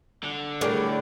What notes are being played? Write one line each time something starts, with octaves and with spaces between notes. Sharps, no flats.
D3
A2 G3 G#4 A#4 D5